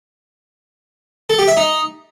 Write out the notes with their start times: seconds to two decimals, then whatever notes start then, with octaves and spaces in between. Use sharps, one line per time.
1.30 A4
1.39 G4
1.48 E5
1.57 D#4